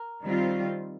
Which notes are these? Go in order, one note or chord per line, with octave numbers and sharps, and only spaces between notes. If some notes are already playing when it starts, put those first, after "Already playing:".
Already playing: A#4
D#3 G3 C4 F4